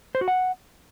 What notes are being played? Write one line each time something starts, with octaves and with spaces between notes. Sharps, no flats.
C5
F#4
F#5